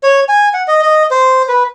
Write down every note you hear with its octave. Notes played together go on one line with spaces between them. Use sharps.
C#5
G#5
F#5
D#5
D#5
C5
B4